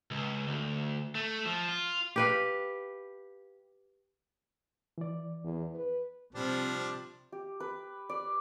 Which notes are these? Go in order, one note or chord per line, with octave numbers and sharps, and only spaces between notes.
C#2
D2
A3
F3
F4
G4 B4 F5
E3 D5
E2
B4
C3 F3 G3 C4 D4
G4
B4
D5